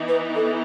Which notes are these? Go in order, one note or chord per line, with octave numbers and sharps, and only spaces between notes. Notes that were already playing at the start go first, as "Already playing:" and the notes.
Already playing: E3 B3 D#4
B4
A4